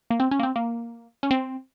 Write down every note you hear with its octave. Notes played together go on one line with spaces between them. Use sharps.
A#3
C4
C#4
A#3
C4
A#3
C#4
C4